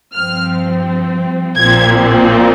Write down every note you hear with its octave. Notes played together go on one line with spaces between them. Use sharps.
G2 F3 C4 F6
A#1 A#2 F3 C4 G#6